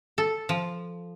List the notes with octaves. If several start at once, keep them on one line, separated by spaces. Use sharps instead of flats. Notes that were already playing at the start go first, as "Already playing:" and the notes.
A4
F3